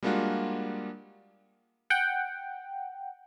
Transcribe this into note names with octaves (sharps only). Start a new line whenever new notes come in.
G3 G#3 A#3 D4 F4 F#4
F#5 G5